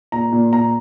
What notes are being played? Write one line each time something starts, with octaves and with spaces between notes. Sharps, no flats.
A#2 A#5
A#2
A#2 A#5